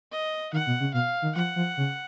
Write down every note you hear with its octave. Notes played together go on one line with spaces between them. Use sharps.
D#5
D#3 F#5
B2
C#3
B2 F5
D#3
F3 F#5
F3
C#3